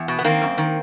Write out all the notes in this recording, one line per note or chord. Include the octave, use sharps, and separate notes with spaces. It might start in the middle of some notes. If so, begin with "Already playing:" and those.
Already playing: E2
B2
B3
D#3 A#3 C4
F#2
D#3